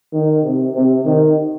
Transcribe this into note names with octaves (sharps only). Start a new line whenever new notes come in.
D#3
C3
C3
D#3